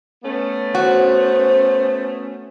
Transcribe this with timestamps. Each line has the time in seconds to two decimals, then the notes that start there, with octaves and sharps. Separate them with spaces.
0.24 A3 B3 C#4
0.75 F#4 C5